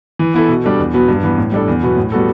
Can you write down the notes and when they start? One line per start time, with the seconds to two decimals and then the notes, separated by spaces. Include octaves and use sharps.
0.19 E3
0.34 B3 E4 A4
0.48 B2
0.64 G3 D4 A4
0.79 E2
0.94 B2 F#3 B3
1.08 G2
1.23 E3 B3
1.38 A2
1.52 G3 D4 A4
1.68 E2
1.82 B2 F#3 B3
1.97 A2
2.12 G3 B3 F#4 A4